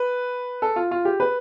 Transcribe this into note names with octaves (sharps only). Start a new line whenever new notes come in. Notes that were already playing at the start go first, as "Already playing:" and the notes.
Already playing: B4
A4
F4
F4
G4
B4